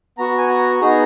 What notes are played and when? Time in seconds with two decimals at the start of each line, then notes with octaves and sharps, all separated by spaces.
0.18 B3 F#4 A#5
0.38 G#5
0.49 A#5
0.80 B3 D#4 G#4 A#5